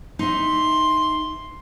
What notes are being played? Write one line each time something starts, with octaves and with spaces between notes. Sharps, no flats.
D#4 E5 C6